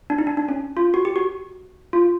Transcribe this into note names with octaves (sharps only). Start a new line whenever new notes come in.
D4
D#4
D4
D4
C#4
F4
F#4
G4
F#4
F4